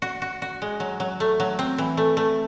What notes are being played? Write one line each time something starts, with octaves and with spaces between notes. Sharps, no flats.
F#4
F#4
F#4
G#3
F#3
F#3
A3
F#3
C4
E3
A3
A3